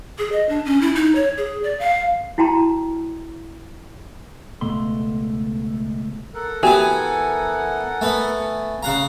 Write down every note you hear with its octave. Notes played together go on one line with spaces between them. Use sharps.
G#4
D#5
D4
C#4
E4
D#4
C#5
G#4
D5
F5
E4 F#4 G5 A5 A#5 C6
C#2 B2 A3 C6
A4 A#4 F#5
E3 B3 F#4 G4 G5 G#5
A3 B3
C#3 F5 F#5 A#5